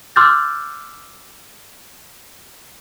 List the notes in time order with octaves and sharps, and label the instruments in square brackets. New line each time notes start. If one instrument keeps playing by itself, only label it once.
[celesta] C6 D6 E6 F6 G6 A6